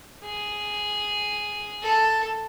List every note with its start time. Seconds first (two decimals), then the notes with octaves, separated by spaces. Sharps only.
0.24 G#4
1.82 A4